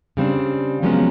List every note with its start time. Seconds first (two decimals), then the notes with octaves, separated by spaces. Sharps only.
0.17 C#3 G3 C4 D4
0.82 C3 F3 F#3 G#3 B3 C#4